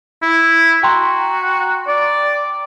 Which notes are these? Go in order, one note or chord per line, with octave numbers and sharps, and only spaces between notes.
E4
F#4 G5 A#5 C6
D5